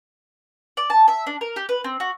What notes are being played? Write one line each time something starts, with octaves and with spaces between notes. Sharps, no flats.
D5
A5
E5
D4
A#4
G4
B4
C4
F#4